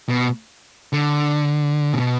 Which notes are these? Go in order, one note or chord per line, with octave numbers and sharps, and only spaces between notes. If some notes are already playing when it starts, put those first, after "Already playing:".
B2
D3
B2